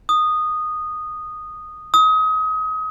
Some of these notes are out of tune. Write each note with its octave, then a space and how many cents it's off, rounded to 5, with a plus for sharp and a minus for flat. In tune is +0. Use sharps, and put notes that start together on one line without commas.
D#6 -10
D#6 +30